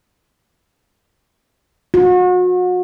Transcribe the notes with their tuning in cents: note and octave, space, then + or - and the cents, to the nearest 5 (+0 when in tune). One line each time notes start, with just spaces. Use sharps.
F#4 -35